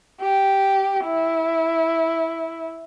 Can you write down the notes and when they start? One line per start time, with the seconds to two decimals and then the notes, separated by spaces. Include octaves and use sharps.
0.22 G4
1.05 E4